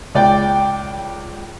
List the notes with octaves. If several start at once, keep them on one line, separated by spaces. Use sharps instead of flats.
C#2 D5 G5